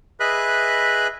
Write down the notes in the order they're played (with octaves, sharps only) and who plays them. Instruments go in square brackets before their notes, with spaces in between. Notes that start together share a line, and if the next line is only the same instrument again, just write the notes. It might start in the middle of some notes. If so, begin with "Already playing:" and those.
[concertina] G#4 B4 D#5 E5 B5 F#6